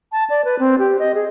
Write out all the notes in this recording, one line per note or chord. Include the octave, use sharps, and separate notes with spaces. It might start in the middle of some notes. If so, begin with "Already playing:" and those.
A5
D5
B4
C4
G4
D#5
G#4